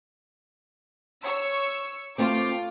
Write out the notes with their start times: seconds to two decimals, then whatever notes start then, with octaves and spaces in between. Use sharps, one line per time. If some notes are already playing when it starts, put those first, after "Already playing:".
1.23 C#5 C#6 E6
2.18 A3 C4 F4 D6